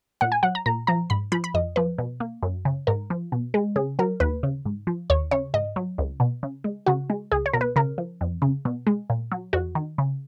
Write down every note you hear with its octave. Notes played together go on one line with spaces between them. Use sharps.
A#2 F#5
G#5
F#3 F#5
A#5
A#2 A#5
F3 A#5
G#2 B5
F3 B5
B5
F2 D#5
F3 B4
B2
A#3
F#2
C#3
G#2 A#4
F3
B2
G#3
C#3 G#4
F#3 A#4
D#2 B4
C#3
G#2
F3
D#2 C#5
C#3 C#5
G#2 D#5
F#3
C#2
B2
C#3
G#3
C#3 F#4
G#3
C#2 G#4
C#5
B2 A#4
B4
C#3 A#4
F3
F2
C#3
B2
G#3
A#2
F#3
F2 F#4
D#3
C#3